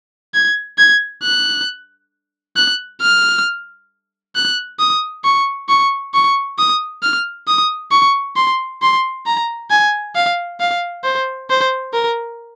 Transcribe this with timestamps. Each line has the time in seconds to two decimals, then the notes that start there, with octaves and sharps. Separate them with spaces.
0.34 G#6
0.78 G#6
1.23 F#6
2.56 F#6
3.02 F6
4.35 F#6
4.79 D#6
5.24 C#6
5.69 C#6
6.14 C#6
6.58 D#6
7.03 F6
7.48 D#6
7.92 C#6
8.36 C6
8.82 C6
9.26 A#5
9.70 G#5
10.15 F5
10.60 F5
11.04 C5
11.50 C5
11.93 A#4